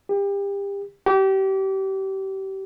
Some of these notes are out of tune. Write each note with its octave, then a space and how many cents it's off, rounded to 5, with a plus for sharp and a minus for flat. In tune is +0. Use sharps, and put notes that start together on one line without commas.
G4 +30
G4 -30